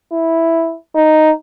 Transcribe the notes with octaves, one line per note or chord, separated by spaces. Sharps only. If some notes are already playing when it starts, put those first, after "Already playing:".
E4
D#4